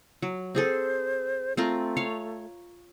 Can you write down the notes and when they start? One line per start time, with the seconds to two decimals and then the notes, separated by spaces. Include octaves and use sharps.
0.22 F#3
0.55 C4 G#4 A4 C5
1.57 A3 C4 F4 A#4
1.97 C#5 F5